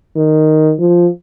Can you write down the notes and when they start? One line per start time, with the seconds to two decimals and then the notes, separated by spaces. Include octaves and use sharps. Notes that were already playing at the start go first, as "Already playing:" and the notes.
0.16 D#3
0.80 F3